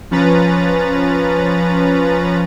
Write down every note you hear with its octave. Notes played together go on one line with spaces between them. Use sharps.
F3 C#4 B4 A#5 A6